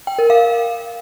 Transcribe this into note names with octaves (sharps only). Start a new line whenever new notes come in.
G5
A#4
F5